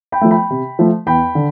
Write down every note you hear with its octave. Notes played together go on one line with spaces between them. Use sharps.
G5 B5
F3 A3
G5 B5
C3
F3 A3
E2 G5 B5
D3